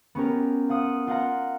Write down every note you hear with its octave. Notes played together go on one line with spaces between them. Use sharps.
B3 C#4 G4 A#4
F4 F#5 D#6
F4 F#5 A#5